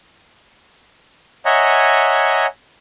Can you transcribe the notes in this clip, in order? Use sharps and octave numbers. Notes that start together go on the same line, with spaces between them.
C#5 D#5 E5 F#5 G#5 A#5